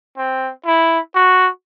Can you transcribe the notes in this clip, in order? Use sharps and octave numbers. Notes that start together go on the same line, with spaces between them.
C4
E4
F#4